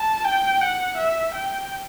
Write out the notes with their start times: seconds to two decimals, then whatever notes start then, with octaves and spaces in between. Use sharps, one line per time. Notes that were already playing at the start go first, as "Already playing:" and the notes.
Already playing: A5
0.24 G5
0.61 F#5
0.97 E5
1.34 G5